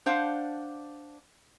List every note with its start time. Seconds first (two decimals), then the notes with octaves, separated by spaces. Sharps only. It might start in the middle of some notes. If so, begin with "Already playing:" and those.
0.06 D4 C5 F5 F#5